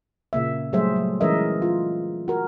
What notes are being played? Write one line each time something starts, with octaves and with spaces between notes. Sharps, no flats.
A#2 C#3 A#3 E5
F#3 G3 A3 G#4 C5 E5
F#3
E3 G#3 C#4 A#4 D#5 E5
F4
F#4 A#4